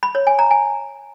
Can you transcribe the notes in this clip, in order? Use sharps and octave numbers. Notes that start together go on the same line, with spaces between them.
B5
C#5
G#5
A#5
G#5